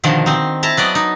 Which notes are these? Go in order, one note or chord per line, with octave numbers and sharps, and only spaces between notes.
B2 D3 D#3 F3
C4 D#4
E4 A5 A#5
F#3 B3 D5 D#5
D#4